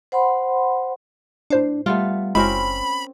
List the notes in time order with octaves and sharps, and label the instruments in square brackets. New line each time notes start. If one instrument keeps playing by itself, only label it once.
[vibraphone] C5 F#5 B5 C6
[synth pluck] A2 C5 C7 [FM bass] D4
[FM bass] G3 [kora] A3 B3 F4
[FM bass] F#1 [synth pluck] G#3 E4 F#4 [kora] C4 C#4 A#4 [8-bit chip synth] B5